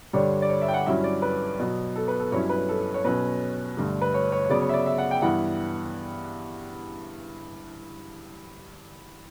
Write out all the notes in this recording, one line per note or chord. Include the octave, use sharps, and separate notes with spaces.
G2 D3 G3 D4 C#5
D5
C#5
E5
G5
F#5
G2 F#3 C#4 E4 E5
D5
B4
B2 F#3 B3
A4
B4
A4
G2 F#3 C#4 E4 C#5
B4
A4
C#5
B2 F#3 C#4 B4
G2 D3 A3
B4
C#5
C#5
C#5
C#3 F#3 B3 D5
C#5
E5
D5
E5
F#5
G5
G2 E3 B3 E4 F#5